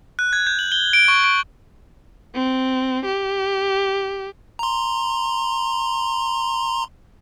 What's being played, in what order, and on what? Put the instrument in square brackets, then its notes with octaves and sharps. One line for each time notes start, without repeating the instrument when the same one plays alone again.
[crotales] F#6
G#6
G6
F#7
G7
D7
C#6
D7
[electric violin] C4
G4
[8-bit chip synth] A#5 C6